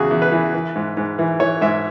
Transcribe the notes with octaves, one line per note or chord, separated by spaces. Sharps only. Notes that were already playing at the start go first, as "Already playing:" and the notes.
Already playing: E2 C#3 F#4 G#4
E2
B4
E3
E3
G#2
G#2
E3
E3 C#5
G#2 E5